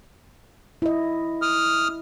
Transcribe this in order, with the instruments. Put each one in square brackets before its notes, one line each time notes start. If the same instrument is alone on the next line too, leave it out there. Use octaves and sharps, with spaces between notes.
[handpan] E4 D#5
[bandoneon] D#6 F6